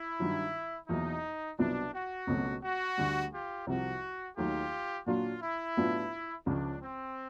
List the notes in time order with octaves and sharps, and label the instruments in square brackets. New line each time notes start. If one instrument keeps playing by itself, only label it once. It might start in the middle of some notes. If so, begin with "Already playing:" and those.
Already playing: [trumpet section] E4
[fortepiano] G2 D#3 F#3
[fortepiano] E2 B2 F#3 A#3 [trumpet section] D#4
[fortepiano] C2 B2 F#3 B3 E4 [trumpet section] D4
[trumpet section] F#4
[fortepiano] C#2 B2 F#3 A3 C4
[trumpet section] F#4
[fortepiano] D2 D3 G3
[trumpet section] F4 G4
[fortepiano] C2 C3 F3 [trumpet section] F#4
[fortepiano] D#2 D#3 F#3 A3 [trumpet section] F4 G4
[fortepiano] A#2 F#3 A#3 D4 F#4 [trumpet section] F4
[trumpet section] E4
[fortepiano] A2 F#3 B3 D4 F4
[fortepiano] C#2 C#3 F3 [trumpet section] D4
[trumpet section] C4